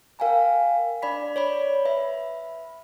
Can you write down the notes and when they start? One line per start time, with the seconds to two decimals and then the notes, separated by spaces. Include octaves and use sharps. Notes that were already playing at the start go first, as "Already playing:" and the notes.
0.19 A#4 F5 G5 G#5 A#5
1.02 D4 D5 B5 B6
1.36 C#5 D5 B5
1.85 B4 E5 B5